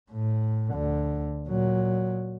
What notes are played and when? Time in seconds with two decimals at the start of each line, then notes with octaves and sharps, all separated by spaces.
0.12 A2
0.74 D2 D3
1.48 A#2 F#3